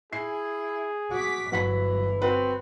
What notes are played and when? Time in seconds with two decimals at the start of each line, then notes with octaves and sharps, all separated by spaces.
0.13 E4 G#4 C7
1.11 F#4 D6 B6
1.52 G1 E3 F#3 F#5 B6
2.22 C4 F#4 B4